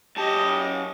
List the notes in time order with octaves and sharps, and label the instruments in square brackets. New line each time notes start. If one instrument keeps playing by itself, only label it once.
[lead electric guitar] F#2 A5 [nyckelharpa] G4 D#5